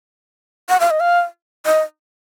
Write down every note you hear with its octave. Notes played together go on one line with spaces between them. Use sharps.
F#5
F5
D#5
F5
D#5